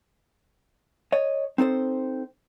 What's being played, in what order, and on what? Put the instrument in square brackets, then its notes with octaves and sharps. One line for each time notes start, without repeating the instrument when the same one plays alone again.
[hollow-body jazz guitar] C#5 D#5
C4 D#4 A4 C5